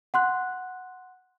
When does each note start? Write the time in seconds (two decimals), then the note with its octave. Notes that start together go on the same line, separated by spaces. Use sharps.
0.14 F#5 C6 F#6